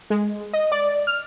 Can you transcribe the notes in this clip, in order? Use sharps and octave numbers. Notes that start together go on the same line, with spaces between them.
G#3
D#5
D5
F6